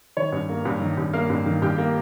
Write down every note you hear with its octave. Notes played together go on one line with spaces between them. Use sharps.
D#3 C#5
G2
A#3
G2
D#3
G2
A#3 F5
G2
D#3
G2 G4
A#3